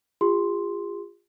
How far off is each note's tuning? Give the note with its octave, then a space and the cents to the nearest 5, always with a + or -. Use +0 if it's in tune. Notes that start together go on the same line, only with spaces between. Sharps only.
F4 +0 G#4 -45 C6 +0